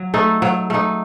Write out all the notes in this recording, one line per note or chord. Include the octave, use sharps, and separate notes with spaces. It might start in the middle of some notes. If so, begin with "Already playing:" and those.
Already playing: F#3
A3 D#4
F#3
A3 D#4